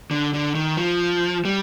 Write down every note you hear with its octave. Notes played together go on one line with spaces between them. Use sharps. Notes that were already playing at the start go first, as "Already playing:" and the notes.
D3
D3
D#3
F3
G3